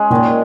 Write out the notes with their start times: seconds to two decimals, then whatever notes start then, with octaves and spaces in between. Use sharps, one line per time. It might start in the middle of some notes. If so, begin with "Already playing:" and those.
Already playing: G#3 C#4
0.10 A#2 D#3